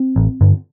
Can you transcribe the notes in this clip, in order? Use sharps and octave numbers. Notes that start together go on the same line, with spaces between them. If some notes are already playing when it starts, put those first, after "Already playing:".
Already playing: C4
A1
G2 D3